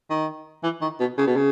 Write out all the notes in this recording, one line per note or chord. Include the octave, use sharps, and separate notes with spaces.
D#3
E3
D#3
B2
C#3
B2
C#3